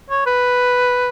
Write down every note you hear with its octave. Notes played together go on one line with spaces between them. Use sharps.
C#5
B4